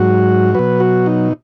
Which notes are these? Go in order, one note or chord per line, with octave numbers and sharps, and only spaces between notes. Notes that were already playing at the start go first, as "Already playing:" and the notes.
Already playing: G#2 F#3 F#4
B2 F#3 B4
F#4
D#4